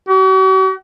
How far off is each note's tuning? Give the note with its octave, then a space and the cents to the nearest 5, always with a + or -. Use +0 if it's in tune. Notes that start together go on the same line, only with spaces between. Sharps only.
F#4 +45